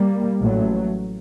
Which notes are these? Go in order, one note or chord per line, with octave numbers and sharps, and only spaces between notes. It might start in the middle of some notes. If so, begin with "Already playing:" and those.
Already playing: G3 A#3
A1 A2 F#3 A3